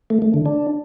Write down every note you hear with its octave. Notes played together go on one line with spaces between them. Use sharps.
A3
A3
D3
D4